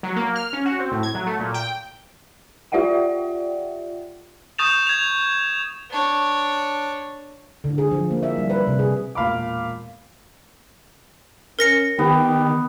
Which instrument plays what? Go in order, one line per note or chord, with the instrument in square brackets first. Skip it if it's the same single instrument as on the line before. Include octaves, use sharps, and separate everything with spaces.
[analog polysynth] F#3
A#3
F6
C#4
F#4
C4
A2
G#6
F#3
A3
A#2
G5
[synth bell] F4 G4 D5 E5 F#5 G5
[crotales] C#6 D#6 G6 A6 E7 F7
G#6 F7
[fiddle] D4 C#5
[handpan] D3
G#4
F3
A#3
E5
G3
B4
C3
G#4
[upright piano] E1 A#2 F5 B5 D6
[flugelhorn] C#4 [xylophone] A#4 A#6 C#7
[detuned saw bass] D#3 [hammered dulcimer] B3 [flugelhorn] G4